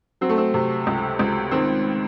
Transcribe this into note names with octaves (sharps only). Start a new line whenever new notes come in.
F#3 C4
A3
C4
C3
C#2
C#2
D#3 C4